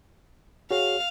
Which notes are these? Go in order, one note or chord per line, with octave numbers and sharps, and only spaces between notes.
F#4 G#4 C#5 F5